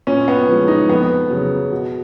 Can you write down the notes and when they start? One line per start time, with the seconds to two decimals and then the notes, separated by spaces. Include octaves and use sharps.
0.07 A#2 C#4
0.28 B3
0.48 F3 G#3
0.68 D#4
0.89 F2 B3
1.30 C#3 F#3
1.71 B2